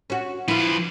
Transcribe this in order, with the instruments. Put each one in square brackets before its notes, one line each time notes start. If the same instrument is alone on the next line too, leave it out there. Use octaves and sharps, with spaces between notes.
[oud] C#4 F#4
[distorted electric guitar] F3 B4 [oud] E4 F4